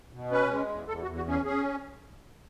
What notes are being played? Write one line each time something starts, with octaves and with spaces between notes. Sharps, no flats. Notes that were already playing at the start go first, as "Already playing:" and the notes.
B2
C#4 B4
G#3
E2
E2 A4
F#4
E2
F#4
C#4 G#4
C#4 G#4